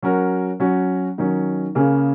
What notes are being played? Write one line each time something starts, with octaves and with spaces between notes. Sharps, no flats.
F#3 C#4 F#4 A#4
F#3 C#4 F#4
D#3 F#3 C#4
C#3 A#3 C#4 G#4